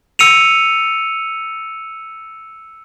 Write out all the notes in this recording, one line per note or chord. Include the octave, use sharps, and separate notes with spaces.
E6 C#7 D#7 F7